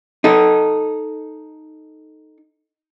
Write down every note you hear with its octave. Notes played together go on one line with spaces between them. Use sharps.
D#4 A4